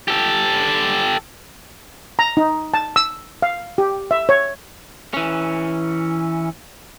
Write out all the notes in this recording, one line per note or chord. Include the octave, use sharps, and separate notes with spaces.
G4 A4
A#5
D#4
A5
E6
F5
G4
E5
C#5
E3 C#4